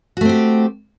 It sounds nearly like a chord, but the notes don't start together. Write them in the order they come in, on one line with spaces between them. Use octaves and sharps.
F#4 A3 C4 G4